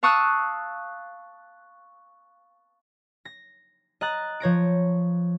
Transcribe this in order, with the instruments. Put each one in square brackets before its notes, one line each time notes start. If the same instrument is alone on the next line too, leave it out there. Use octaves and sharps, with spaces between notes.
[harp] F5 A5 C#6 D#6 E6 F#6
A#6
D#5 A#5 F#6 A6
F3 C#5 A#6 D7